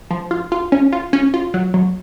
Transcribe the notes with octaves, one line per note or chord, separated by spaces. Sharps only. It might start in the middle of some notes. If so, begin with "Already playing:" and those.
F3
F4
F4
C#4
F4
C#4
F4
F#3
F#3